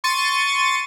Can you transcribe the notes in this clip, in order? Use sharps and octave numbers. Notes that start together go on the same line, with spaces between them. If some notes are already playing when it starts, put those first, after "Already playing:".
C6 C#6 A6 D#7